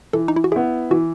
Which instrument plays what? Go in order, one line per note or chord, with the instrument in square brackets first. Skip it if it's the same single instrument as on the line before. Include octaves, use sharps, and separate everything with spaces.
[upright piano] E3 [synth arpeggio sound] A4
[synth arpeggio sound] D#4
E4
F#4
[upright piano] B3 E4 [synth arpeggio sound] G#4
[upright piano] E3 [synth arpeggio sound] F#4